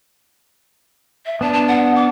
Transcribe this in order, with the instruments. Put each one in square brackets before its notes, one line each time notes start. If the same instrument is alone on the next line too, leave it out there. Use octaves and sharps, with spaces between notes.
[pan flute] E5
[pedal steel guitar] B3 D4 [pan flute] A5
[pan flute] A5
F#5
D6